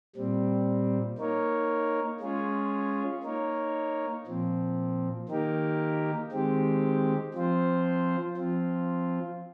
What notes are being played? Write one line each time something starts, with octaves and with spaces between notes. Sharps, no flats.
A#2 G3 C4
A#3 D#4 A#4 C#5
G#3 C#4 F4 G#4 C#5
A#3 D#4 A#4 C#5
A#2 F3 C4
D#3 A#3 D#4 G4 A#4
D#3 G#3 C4 G4
F3 C4 F4 C5
F3 C4 F4